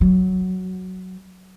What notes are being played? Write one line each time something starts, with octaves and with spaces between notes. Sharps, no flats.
F#3